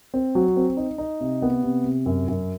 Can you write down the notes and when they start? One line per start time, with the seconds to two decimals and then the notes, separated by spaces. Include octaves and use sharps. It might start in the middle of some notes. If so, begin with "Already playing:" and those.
0.14 C4
0.35 F#3
0.57 C4
0.77 D#4
0.98 D#4
1.20 C3
1.42 B3
1.63 C3
1.85 C3
2.06 F#2
2.28 F#2